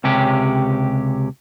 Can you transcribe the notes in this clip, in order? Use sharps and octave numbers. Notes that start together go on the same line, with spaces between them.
C#2 C3 C#4 G4